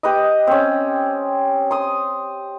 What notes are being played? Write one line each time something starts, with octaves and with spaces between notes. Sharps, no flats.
G4 B4 D#5
C4 C#4
C6 D#6